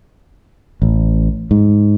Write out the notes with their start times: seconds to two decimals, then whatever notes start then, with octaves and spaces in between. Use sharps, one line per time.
0.82 A1
1.51 G#2